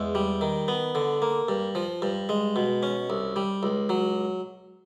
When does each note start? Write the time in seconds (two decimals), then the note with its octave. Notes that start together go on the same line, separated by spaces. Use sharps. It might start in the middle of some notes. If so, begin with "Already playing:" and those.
Already playing: E2 G#3
0.15 G3
0.41 D#3
0.68 B3
0.95 D3
1.22 A#3
1.48 G2
1.75 F3
2.02 G2
2.29 G#3
2.56 B2
2.83 C#4
3.10 C2
3.36 G3
3.63 C#2
3.89 F#3